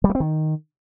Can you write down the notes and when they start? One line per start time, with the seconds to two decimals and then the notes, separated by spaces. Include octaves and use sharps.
0.04 G3
0.09 A3
0.15 C4
0.20 D#3